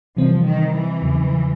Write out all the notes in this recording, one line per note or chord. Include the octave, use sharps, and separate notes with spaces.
C3 E3 F3 G3 C4
D#3
E3
E2 C#3 F#3